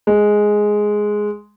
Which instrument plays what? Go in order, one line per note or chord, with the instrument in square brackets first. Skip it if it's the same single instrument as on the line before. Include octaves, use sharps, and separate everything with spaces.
[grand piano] G#3